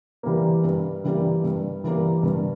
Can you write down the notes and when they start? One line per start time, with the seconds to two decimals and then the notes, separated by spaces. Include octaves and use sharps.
0.23 E3 G3 A#3
0.64 G2
1.04 E3 G3 A#3
1.44 G2
1.84 E3 G3 A#3
2.23 G2